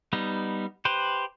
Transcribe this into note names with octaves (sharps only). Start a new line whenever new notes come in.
G3 B3 D#4
G4 B4 C5